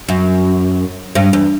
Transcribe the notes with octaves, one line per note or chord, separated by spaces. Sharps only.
F#2
G2
E2